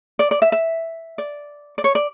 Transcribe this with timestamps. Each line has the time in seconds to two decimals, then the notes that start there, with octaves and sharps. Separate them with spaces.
0.19 D5
0.31 D5
0.42 E5
0.52 E5
1.18 D5
1.78 D5
1.84 C#5
1.95 D5